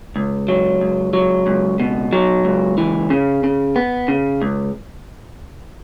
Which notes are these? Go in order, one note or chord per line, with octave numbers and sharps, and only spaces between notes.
C#2
F#3
C#2
F#3
C#2
B2
F#3
C#2
E3
C#3
C#3
B3
C#3
C#2